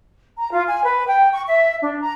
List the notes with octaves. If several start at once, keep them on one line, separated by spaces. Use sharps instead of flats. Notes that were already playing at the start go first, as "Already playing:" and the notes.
A#5
F4
G#5
B4
G5
C#6
E5
D4
A#5